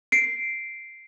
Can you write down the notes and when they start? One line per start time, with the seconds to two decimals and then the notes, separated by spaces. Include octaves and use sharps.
0.12 C7 D7